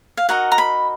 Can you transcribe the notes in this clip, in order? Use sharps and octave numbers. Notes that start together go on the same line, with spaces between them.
F5
D#4 F#4 A#4 D#5 F#5
A#5
B5